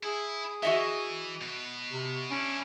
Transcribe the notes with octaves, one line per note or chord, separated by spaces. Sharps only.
E4 G#4
E3 F#4 D#5 E5
B2 B4
C3
C#4 D4 E4